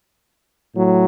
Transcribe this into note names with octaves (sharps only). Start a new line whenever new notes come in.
A2 F#3